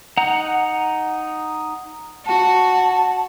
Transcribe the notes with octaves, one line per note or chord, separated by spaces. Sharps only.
D#4 F#5 A#5
F#4 A5